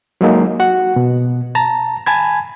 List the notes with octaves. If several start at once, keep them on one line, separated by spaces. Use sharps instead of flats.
F#3 G#3 A#3 D#4
F#4 F#5
B2
A5 A#5
G#5 A5 B5 G#6